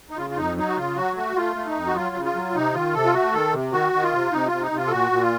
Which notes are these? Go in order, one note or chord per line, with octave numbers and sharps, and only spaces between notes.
D#4
C#3 F4
F4
F2 D#4
F#3 D#4
F#4
C#3 F4
F#3 F#4
A3 F#4
A3 F4
A3
D#4
F2
F#4
F#3 F4
C#3
F4
F#3
C3 D#4
D#3 F4
C3 A4
F4
A3 F#4
D#3 A4
C3
D#3 F#4
D#3
F4
C3
C3 D#4
C3 F4
D#4
C3
F4
A4
A#2 F#4
A#2
F4